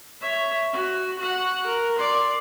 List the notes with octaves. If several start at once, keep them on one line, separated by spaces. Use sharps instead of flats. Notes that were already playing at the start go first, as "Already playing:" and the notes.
C#5 E5
F#4
F#4 F#5
A#4
D5 C6